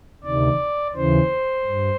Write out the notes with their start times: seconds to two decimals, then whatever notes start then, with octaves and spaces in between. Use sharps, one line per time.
0.24 D2 C3 D#3 D5
0.95 D#2 C#3 E3 C5
1.66 G2